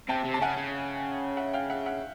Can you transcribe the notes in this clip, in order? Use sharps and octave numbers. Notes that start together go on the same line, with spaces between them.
C3 G5 A5
C3
A5
C#3 F#5 G#5
C#3
E5 F#5
F5 G5
E5 F#5
E5 F#5